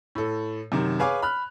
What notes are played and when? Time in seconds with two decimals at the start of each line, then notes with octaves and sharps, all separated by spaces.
0.15 A2 A4
0.72 F#2 C3 D#3
0.99 G#4 B4 C#5 F5 G#5 D6
1.22 B5 F6 F#6